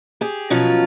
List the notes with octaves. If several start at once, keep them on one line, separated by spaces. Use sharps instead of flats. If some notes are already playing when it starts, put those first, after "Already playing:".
G4 G#4
B2 F3 F#3 C#4 F4